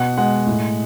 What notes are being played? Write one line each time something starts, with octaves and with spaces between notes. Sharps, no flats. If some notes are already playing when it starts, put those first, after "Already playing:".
Already playing: B2 F#5
G#3 F#5
A2